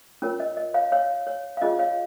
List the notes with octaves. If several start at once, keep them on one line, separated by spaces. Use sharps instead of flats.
C#4 F4 A#4 C#5
D#5
D#5
C#5 F5
C#5 F5
C#5
F5
C#4 F4 G#4 D#5
C#5 F5